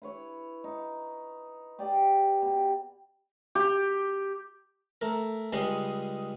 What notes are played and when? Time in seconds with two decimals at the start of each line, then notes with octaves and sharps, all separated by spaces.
0.02 E4 B4 C#5
0.64 D#4
1.79 G4 G#4 D5 G5
2.42 B2 G4
3.55 G4
5.01 A3 A#4
5.52 C#2 C#3 G3 G#3 D#5 C6